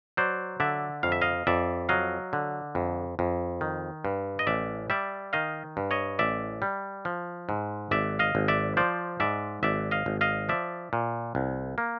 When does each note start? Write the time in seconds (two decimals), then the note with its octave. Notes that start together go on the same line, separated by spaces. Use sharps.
0.17 F#3 C5 D5
0.60 D3 D5 E5
1.03 F2 F5
1.12 E5
1.22 D#5 F5
1.47 F2 D5 E5
1.89 F#3 D#5 F5
2.33 D3
2.75 F2
3.19 F2
3.61 D#3
4.05 G2
4.39 D#5
4.47 A1 D5 E5
4.90 G3 D5 E5
5.33 D#3 D#5 F5
5.77 G2
5.91 C#5 D#5
6.19 A1 D5 E5
6.62 G3
7.05 F3
7.49 G#2
7.91 G#1 D5 E5
8.19 D#5 F5
8.35 G#1
8.48 D5 E5
8.77 F3 C5 D5
9.20 G#2 D5 E5
9.63 G#1 D5 E5
9.91 D#5 F5
10.06 G#1
10.21 D#5 F5
10.49 F3 D5 E5
10.93 A#2
11.35 C2
11.78 A#3